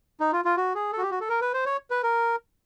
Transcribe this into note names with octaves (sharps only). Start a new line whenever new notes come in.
D#4
F4
F4
F#4
G#4
A4
F#4
G4
F#4
A4
A#4
B4
C5
C#5
B4
A#4